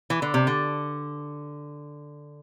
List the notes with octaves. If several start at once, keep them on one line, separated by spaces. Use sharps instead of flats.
E3
D3
C3
D3